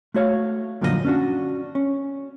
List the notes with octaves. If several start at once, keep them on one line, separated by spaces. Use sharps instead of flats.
A3 F#4 C#5 F5
F#2 A#2 D3 F3 G#4 D#5
C#4 D4 F#4
C#4